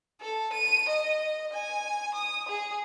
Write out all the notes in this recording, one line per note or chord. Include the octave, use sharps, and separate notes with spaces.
A4
D#7
D#5
G#5
D#6
G#4